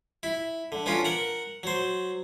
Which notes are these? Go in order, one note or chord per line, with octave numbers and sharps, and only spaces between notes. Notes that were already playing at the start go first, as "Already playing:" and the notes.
E4
D3
B3 C#4 D4 F4
A#4 F#5 A#5
F#3 C5